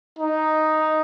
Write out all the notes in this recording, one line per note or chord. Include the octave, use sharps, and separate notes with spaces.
D#4